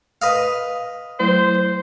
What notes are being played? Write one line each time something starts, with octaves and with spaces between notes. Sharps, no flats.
B4 D#5 F5
F#3 A3 E4 C5